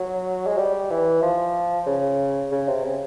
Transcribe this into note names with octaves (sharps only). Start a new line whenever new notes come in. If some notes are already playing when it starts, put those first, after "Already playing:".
Already playing: F#3
G#3
G3
E3
F3
C#3
C#3
C3
C#3